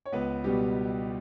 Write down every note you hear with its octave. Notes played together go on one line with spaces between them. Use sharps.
C#5
C#2 B3 B4
B2 G3 B3 G4